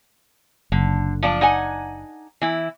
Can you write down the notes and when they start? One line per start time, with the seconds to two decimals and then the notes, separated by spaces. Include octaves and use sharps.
0.72 F#1 D3
1.23 F3 D4 A5
1.41 D#4 F#5 G#5
2.41 E3 E4